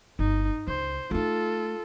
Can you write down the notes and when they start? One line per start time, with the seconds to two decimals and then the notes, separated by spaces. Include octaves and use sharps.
0.19 G1 D#4
0.68 C#2 C5
1.11 A3 D#4 F4 A4